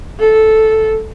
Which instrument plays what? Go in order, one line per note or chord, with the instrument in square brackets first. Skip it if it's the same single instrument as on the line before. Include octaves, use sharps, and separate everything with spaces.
[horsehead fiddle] A4